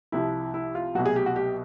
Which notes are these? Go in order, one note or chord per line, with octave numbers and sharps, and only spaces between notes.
C2 C3 F3 E4
E4
F4
C2 B2 F#3 F#4
G#4
G4
F#4
G4